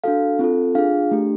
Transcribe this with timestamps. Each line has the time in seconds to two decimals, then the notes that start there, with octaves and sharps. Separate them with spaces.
0.04 D4 F#4 A4 F5
0.39 C4 F4 A4
0.75 D4 F4 G#4 F5
1.11 A3 D4 G4